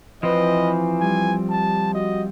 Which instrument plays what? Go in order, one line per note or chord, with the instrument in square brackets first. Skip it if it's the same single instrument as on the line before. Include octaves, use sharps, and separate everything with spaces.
[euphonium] E3 [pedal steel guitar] F3 C4 [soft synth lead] B4 [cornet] D#5
[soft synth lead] G3 [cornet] G#5
[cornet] A5
[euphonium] F#4 [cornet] D#5